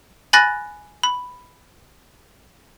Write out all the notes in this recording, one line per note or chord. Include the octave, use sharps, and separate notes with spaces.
G#5 B5 F#6 A6 A#6
B5